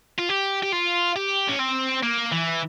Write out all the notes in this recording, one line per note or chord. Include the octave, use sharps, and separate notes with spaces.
F4
G4
G4
F4
G4
C#4
C4
A#3
E3